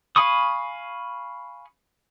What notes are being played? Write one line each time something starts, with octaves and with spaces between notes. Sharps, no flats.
F5 G#5 B5 C#6 D#6